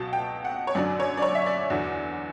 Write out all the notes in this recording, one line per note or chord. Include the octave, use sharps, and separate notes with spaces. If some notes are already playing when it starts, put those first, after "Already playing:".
Already playing: C#2 B2 F#3 A5
G5
F#5
C#5
F#2 D3 F#3 D5
C#5
D5
C#5
E5
D5
E2 D3 F#3